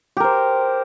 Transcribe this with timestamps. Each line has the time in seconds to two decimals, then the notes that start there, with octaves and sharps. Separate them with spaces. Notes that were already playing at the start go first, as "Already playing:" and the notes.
0.17 G4
0.20 A#4
0.24 C5